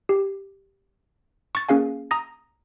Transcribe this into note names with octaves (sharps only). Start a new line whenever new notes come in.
G4
C#6 A6
A#3 C#4 G#4 F5 G#5
A#5 D#6 A#6